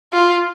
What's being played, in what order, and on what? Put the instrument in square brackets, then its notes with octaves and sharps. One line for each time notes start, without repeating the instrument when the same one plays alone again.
[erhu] F4